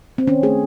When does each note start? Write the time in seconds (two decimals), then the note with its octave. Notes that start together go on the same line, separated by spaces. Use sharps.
0.18 C4
0.27 D#3 C#4
0.43 A3 G#4